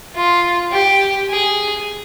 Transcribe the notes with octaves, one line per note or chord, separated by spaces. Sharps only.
F4
G4
G#4